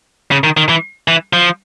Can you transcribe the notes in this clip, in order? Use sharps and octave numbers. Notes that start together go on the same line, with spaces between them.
C#3
D#3
D#3
E3
E3
F3